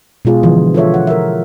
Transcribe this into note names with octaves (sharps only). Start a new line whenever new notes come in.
B2 G#3 F4 G#4
D3 E3 F3
F4 A4 C#5 E5
F#5
A#4 E5